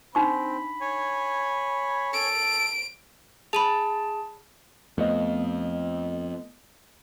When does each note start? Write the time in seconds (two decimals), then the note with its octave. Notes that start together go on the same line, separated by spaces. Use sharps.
0.15 C4 D4 D#4 B5 C#6
0.81 C#5 G#5
2.13 A4 D7
3.53 G#4 A5 B5 D#7 F7
4.98 F2 A3 B3 D#5